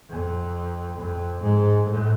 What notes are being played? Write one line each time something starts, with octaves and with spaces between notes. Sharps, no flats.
F2
F2
G#2
A2